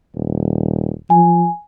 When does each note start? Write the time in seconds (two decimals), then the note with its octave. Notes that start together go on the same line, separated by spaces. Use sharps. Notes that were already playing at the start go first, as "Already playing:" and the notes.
0.15 D#1
1.10 F3 G#5